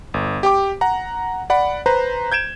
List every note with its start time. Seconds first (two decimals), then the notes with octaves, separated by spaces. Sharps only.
0.14 G1
0.43 G4 G5 D6
0.81 F#5 A#5
1.50 D5 F#5 B5
1.86 B4 C5 A#5
2.32 G6 G#6 D7 E7